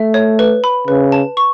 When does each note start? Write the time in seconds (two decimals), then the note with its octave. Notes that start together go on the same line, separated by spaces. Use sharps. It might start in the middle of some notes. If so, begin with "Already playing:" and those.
Already playing: A3 E5
0.14 C#5
0.39 B4
0.64 B5
0.88 C#3 B4
1.12 A5
1.37 C#6